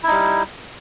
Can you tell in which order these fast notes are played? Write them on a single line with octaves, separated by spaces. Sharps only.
E4 D#4 G3